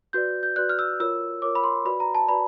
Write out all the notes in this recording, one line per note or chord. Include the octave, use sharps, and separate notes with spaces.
F#4 B4 D5 G6
G6
F#4 B4 D5 F#6
F6
E6
F4 A#4 C#5 E6
F4 A#4 C#5 D6
B5
C6
F#4 B4 D5 B5
A#5
A5
F#4 B4 D5 B5